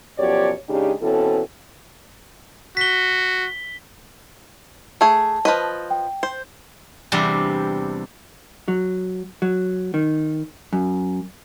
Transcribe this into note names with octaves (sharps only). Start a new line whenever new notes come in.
F#2 B2 F3 G4 C#5 D5
C#3 G#3 D4 D#4 G4
B2 E3 C4 C#4 A4
F#4 B6 G7
A3 G#4 A5
F3 B4 D#5
G5
C5
E2 C3 G3 D4
F#3
F#3
D#3
F#2